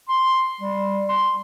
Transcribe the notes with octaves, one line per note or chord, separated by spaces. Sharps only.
C6
G3
C6